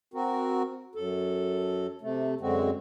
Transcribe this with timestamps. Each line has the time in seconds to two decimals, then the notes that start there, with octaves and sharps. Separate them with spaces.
0.14 C4 F#4 A#4
0.95 F#2 A4
2.02 C3 A3
2.41 F#2 D3 G#3 C4 F#4